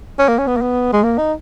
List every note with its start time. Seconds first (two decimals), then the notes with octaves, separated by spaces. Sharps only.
0.19 C#4
0.28 A#3
0.38 C#4
0.47 B3
0.56 A#3
0.61 B3
0.93 G#3
1.03 A#3
1.18 D#4